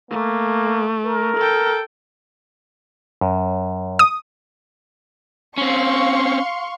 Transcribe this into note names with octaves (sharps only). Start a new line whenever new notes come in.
A3 A#3
A#4
A4 G5
F#2
D#6
C4 C#4 F5 C6 C#6